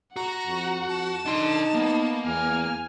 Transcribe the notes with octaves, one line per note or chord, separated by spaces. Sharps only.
F#4 F#5 A#5
F2
F2 A5
D4 D#4 C6
A#3 B3
E2 G#5 F6